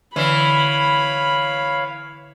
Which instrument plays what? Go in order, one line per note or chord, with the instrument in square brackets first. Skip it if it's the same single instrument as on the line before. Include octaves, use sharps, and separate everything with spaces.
[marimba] D3 [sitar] E3 [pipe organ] C#5 F5 [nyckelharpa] B5